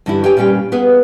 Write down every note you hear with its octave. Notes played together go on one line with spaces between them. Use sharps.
G2 D3 E3 D4 E4 G4
G4 B4 C#5 F5 G5 G#5
A#2 G3 C#4 F5 G5
B3 G#4 B4 F5